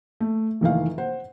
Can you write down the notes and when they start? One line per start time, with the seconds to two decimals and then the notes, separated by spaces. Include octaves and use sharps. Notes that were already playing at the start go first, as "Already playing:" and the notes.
0.20 A3
0.61 F1 D#3 E3 F5
0.98 C5 F#5